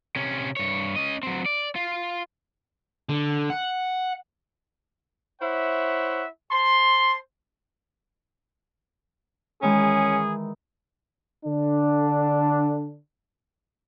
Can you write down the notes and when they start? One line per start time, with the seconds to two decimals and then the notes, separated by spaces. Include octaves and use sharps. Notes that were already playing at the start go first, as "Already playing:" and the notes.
0.16 C3 C#4
0.57 G2 C#5
0.96 C#4 D#5
1.23 F#3 C4
1.46 D5
1.76 F4
3.09 D3
3.50 F#5
5.42 E4 C5 C#5 E5 F#5
6.52 C5 A5 C6
9.62 D#3 E3 G#3 C#4 G#4
11.46 D3 D4